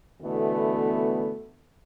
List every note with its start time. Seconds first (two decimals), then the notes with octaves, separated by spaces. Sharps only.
0.22 B2 D3 E3 A3 B3